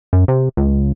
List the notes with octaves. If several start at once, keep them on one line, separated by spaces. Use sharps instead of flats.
F#2
C3
C#2